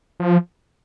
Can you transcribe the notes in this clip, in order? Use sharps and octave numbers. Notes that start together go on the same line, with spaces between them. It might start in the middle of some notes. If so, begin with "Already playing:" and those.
F3